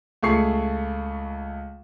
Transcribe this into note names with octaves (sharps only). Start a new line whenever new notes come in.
C#2 A3 G#4 C#6 C7